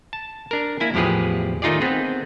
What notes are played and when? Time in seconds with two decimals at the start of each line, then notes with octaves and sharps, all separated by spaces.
0.13 A5
0.51 D4 A#4
0.80 A#3 E4 G#5
0.94 E2 A2 F3 G4 G#4 B4
1.62 D#3 A3 D#4 F4 G#4 D5
1.80 B3 C4 G#4 B4